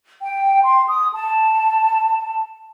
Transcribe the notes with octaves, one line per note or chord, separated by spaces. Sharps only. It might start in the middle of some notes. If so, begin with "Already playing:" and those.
G5
C6
D#6
A5